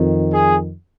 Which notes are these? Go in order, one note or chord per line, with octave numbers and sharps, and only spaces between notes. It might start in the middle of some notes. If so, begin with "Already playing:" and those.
Already playing: F2 D#3
G#4